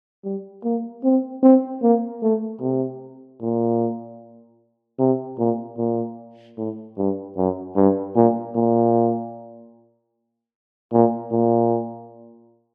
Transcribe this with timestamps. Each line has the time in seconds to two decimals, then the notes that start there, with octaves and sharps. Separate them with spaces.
0.24 G3
0.64 A#3
1.04 C4
1.43 C4
1.82 A#3
2.22 A3
2.61 C3
3.41 A#2
4.99 C3
5.39 A#2
5.77 A#2
6.58 A2
6.97 G2
7.37 F#2
7.76 G2
8.15 A#2
8.55 A#2
10.93 A#2
11.32 A#2